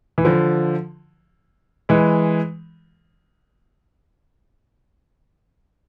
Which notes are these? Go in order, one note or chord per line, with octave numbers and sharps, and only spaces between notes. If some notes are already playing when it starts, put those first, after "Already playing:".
E3
D3 F3
E3 G#3